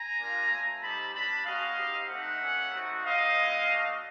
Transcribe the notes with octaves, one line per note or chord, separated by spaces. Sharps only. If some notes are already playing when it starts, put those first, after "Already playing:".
Already playing: G#5 A#5
G3 A#3 D4 F4
A3 C4 F4
G3 C4 D#4 G4 A5 B5
G3 B3 D4 A5 B5
G#3 C#4 F#4 D#5 F5
C4 D#4 G4
A3 C4 D#4 E5 F#5
G3 A#3 C#4
A3 C4 D#4 F#4
C4 D#4 G4 D#5 F5
G#3 B3 E4
A3 D4 F#4